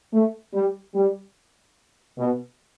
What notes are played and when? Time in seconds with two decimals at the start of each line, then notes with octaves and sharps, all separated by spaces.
0.13 A3
0.54 G3
0.95 G3
2.18 B2